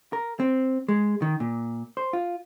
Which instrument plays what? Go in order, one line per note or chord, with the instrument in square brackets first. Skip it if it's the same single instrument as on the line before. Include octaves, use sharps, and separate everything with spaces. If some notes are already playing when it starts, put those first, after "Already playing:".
[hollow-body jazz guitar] A#4
C4
G#3
D#3
A#2
C5
F4